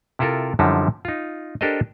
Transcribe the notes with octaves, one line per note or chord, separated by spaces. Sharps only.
C3 E4 F4 A4 A#4
F#2 D3 F3 G3 D#4 E4
D#4 F4
D4 G4 A4 A#4 C5 D#5